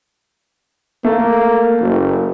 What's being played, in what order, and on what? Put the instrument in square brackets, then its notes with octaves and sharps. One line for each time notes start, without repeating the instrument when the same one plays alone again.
[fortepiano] A3 [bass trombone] A#3
[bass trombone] F#1